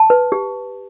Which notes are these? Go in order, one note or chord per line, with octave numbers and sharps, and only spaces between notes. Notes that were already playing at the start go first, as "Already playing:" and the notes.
Already playing: A5
B4
G4